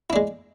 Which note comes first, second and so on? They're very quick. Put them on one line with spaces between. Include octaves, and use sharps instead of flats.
E4 D4 G#3